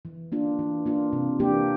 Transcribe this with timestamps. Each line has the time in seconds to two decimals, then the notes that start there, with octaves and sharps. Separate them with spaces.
0.05 E3
0.32 A#3 D4 F4
0.59 E3
0.86 A#3 D4 F4
1.13 C3
1.39 E3 A#3 D4 G4